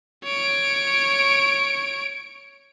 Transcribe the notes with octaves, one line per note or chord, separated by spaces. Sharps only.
C#5 D7